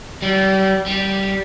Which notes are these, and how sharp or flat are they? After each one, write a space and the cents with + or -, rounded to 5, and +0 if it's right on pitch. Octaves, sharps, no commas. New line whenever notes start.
G3 -35
G3 -15